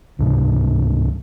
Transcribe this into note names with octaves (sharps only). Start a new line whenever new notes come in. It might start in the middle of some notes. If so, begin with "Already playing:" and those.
C#2 G#2 C3 G3